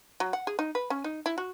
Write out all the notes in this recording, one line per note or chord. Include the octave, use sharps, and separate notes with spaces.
F#3
F#5
G#4
D#4
B4
C#4
D#4
E4
F#4